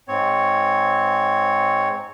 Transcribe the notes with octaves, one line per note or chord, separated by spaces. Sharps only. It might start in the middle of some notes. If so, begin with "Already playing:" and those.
G#2 C4 C#5